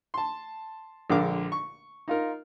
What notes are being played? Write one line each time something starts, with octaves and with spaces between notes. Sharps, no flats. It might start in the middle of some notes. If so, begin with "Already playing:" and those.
A5 C6
A#1 D3 G#3 A#4 F5 D6
C#6
D#4 F4 A#4